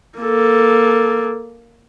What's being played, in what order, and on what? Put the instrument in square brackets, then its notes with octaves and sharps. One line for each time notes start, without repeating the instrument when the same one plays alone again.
[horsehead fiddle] A#3 A4